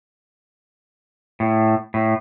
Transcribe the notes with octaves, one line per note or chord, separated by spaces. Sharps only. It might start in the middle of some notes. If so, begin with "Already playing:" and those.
A2
A2